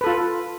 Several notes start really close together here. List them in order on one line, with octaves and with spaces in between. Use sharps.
B4 A4 F4